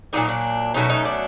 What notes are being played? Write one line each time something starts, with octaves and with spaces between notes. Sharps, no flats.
A#2 F#3 A#3 D4 D#4
D4
B2 F#3 A3 C#4 D#4
D#4
D4